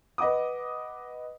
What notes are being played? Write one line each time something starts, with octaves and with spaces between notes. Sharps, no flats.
B4 D#5 F#5 D6 D#6